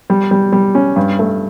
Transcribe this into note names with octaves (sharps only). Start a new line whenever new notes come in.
G3
G3
G3
C#4
G2
A3